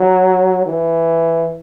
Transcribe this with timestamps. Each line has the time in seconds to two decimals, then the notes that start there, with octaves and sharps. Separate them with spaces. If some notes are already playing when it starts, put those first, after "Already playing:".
Already playing: F#3
0.66 E3